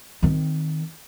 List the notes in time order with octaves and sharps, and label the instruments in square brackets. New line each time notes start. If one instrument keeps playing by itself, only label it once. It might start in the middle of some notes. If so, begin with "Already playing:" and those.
[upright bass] D#3 C4